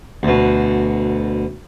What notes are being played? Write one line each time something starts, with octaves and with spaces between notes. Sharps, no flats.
D2 B2